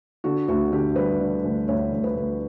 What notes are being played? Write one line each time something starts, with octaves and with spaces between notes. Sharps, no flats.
D3 F#4
D2 F#4
D3 G4
G3 B4
D3
D2
D2 C#5
D2
B4
D2